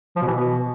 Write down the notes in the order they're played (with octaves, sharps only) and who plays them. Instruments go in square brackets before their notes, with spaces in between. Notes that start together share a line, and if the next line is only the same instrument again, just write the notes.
[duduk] F3
B2
E3
B2